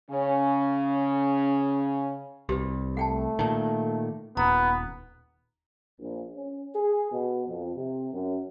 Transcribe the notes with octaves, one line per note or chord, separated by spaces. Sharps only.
C#3 C#4
C2 G4 B4
A3 F#5 G5 A5
A#2 D#3 A5
D#1 B3 A#5
A#1
C#4
G#4
B2
F2
C3
F#2